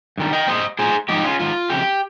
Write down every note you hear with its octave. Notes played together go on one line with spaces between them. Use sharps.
G2 D#3 G3
D#5 G5
A#2 G3 C5 D#5
A#2 F3 G#4 C5
G#2 F3 D#4 G4
C#4 F4
G#2 D#3 F4
F2 C#3 G4